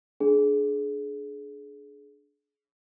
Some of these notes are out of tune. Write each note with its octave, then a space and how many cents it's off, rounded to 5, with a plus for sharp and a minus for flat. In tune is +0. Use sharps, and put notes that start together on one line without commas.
D4 +0 G#4 +25